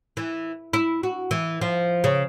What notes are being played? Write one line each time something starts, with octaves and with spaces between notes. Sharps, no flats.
E3
E4
F#4
E3
F3
C#3